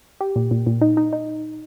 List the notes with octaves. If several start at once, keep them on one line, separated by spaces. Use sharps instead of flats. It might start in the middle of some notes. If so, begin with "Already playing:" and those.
G4
A#2
A#2
A#2
D#4
D#4
D#4